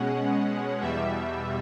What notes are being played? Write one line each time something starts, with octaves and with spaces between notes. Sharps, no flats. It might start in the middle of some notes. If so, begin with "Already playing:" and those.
Already playing: B2 G#3 C#4 F#5
E2 B2 G3 E5